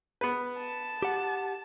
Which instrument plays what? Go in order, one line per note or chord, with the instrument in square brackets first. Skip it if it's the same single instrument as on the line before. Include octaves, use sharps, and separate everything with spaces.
[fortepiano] B3 B4
[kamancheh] A5
[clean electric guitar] G4 F#5